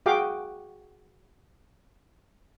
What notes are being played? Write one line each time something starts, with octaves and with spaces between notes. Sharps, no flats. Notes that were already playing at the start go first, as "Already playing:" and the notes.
F#4 G#4 F5 G5 D6